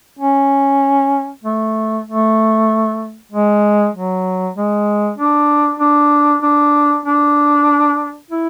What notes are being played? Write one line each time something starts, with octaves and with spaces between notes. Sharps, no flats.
C#4
A3
A3
G#3
F#3
G#3
D4
D4
D4
D4
E4